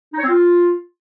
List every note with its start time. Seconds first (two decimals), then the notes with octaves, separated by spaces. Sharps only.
0.13 D#4
0.19 C#5
0.24 C4
0.29 F4